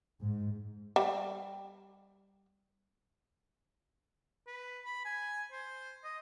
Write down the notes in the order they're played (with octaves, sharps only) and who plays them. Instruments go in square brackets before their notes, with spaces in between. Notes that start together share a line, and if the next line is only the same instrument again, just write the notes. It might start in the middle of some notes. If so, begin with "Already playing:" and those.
[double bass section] G#2
[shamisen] G3 G4
[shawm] B4
B5
G#5
C5
D#5